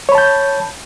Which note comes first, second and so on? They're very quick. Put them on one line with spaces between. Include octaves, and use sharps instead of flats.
C#5 B5 A5 G6